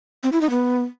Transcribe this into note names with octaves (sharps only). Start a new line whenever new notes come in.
C4
E4
D#4
B3